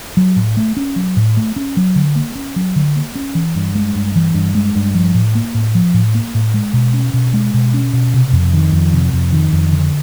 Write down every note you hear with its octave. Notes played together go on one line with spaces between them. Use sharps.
F#3
A2
A3
C#4
F#3
A2
A3
C#4
F#3
D3
A#3
C#4
F#3
D3
A#3
C#4
E3
G2
G#3
G2
E3
G2
G#3
G2
F3
A2
A#3
A2
F3
A2
A#3
A2
G#3
B2
C#4
B2
G#3
B2
C#4
B2
C3
F2
D#3
F2
C3
F2
D#3
F2
D3